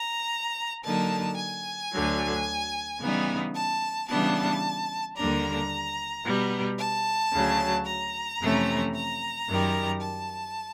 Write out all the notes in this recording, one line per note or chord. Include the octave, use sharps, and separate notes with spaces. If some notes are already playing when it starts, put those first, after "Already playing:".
Already playing: A#5
D3 F#3 A#3 D#4 A5
G#5
D2 D3 F#3
C#3 E3 G3 B3 D#4
A5
C#3 E3 G3 B3 D4 A5
D#2 D3 G3 A#3 D4 A#5
B2 G3 B3
A5
D2 C#3 F#3
A#5
F2 C3 E3 A3 C#4
A#5
F#2 D#3 G3
A5